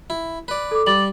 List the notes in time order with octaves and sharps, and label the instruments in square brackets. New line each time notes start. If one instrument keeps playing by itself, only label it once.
[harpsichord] E4
B4 D5
[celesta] A4 D6
[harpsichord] G3 [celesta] D6 A6 F#7